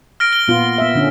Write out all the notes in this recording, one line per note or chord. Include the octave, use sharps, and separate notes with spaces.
F6 A#6 D7
G7
A#2 B3 F4
B3 E5
D3 C#4